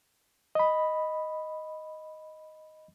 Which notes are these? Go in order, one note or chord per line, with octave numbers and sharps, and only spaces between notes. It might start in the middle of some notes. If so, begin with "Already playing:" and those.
D#5 B5